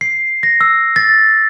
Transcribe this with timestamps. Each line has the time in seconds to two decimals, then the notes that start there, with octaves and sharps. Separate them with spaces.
0.01 C7
0.43 A#6
0.61 E6
0.96 A6